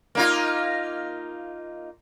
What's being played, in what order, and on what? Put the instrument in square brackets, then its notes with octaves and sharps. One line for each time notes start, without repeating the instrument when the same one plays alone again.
[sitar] A#3 D#4 F4